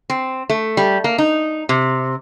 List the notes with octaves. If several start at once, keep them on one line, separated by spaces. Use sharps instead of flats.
C4
A3
G3
A#3
D#4
C3